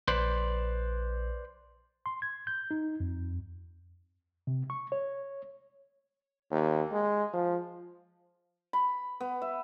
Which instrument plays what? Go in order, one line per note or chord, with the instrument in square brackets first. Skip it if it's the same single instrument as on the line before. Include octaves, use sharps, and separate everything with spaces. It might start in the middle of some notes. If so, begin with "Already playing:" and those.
[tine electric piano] A#1 [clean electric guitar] B4 C5 D5
[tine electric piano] C6
G#6
G6
D#4
F2
[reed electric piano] C3
C#6
C#5
[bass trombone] D#2
G#3
F3
[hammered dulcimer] B5
B3
E5